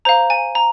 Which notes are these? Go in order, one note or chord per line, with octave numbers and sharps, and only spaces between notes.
C5 F5 A#5
G#5
A#5